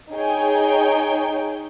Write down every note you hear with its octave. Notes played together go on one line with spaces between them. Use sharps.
D#4 G#4 C#5 G5